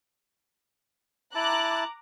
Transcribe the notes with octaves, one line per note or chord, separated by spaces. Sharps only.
E4 A5 A#5 D6 F#6